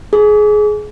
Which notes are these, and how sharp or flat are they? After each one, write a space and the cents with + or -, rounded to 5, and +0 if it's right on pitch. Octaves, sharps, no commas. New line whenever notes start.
G#4 +20